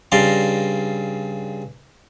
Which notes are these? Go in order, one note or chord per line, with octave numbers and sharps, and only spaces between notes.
G2 C#3 D5 A5 A#5 C6